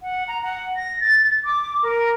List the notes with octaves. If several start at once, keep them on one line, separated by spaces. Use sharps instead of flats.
F#5
A#5
F#5
A#6
A6
D6
A#4